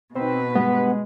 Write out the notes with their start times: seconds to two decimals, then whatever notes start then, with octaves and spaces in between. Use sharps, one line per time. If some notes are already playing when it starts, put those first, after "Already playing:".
0.15 B2 B3 C4 D#4 B4
0.55 G2 G#3 B3